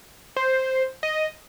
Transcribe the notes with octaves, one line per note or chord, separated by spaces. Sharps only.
C5
D#5